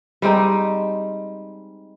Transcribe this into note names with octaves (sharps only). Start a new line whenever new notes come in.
G3 G#3 C4 D#4